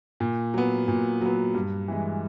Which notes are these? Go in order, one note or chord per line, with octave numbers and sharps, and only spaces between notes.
A#2
F#3 B3
A#2
F#3 B3
G2
E3 G#3